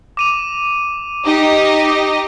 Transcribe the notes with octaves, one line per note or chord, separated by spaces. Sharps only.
D6 D#7 F7
D#4 G4 D#5